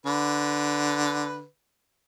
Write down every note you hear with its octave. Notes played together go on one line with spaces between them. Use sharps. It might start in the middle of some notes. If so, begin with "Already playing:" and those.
D3 B4